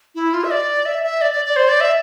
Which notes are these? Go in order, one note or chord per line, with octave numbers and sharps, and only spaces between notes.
E4
F4
E5
D5
E5
E5
D5
D5
D5
C5
D5
E5